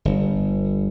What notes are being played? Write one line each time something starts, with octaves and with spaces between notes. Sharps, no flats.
G1